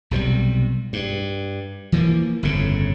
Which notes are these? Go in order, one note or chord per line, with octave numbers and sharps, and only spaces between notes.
B1 C3 F3 G3
G2
E3 F3 G#3 A#3
G1 F2 A2 C#3